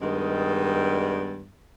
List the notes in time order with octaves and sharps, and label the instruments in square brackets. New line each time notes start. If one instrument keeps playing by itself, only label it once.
[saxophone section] G2 D#3 G3 G#3 B3